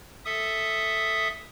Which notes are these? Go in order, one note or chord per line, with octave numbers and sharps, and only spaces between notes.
A4 E5 D#6